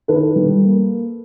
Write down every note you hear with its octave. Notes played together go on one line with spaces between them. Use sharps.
D#3 A4 B4
G3
A#3